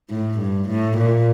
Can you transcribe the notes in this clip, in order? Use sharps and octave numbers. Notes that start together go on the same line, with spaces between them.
A2
G2
A2
A#2